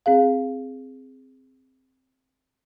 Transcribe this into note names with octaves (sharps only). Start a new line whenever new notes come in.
C4 G#4 F5